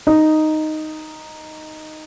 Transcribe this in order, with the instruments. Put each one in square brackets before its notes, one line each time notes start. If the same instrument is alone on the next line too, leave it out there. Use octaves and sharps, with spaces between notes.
[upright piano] D#4